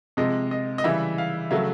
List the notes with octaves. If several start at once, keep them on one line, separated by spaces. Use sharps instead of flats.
C3 F3 G#3 D#5
D#5
D#5
C#3 E3 G3 E5
F5
C#3 F#3 A3 E5